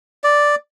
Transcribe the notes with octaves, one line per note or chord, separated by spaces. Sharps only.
D5